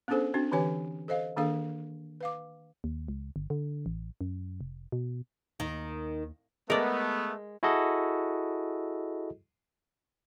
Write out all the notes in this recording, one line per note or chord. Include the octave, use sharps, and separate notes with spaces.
B3 C#4 D4 G#4 A4 C5
C4 D4 F#4
D3 E3 G4 B4 C#5 G#5
A4 C5 D#5 F5
D#3 A#3 D4 G#4 A4 F5
B4 F5 D6
D#2
C#2
G1
D3
A1
F#2
F1
B2
D#2 D#3
G#3 A3 B3 A#4 D5
E4 F#4 G#4 A4 D#5